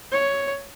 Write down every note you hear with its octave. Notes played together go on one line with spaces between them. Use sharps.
C#5